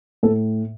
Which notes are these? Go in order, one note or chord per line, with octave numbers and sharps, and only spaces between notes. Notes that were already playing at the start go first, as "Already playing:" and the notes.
A2 A4